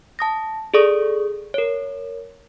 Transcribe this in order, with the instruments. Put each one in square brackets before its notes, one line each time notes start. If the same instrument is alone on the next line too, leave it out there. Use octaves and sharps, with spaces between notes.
[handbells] A5 D#6 A#6
G#4 A4 D5 C#6 D#6
A#4 C#5